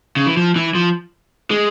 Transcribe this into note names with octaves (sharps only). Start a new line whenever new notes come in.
C#3
E3
F3
E3
F3
G#3